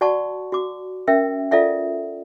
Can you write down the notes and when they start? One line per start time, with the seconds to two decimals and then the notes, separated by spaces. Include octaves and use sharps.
0.01 F#4 D5 F#5 A5 C#6
0.52 F#4 D6
1.07 C#4 A#4 E5 G5
1.51 F4 A4 D5 E5 F#5